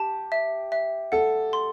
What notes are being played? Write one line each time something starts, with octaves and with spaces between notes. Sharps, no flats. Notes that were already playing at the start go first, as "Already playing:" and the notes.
Already playing: G4 A5
E5
E5
A4 F#5
C6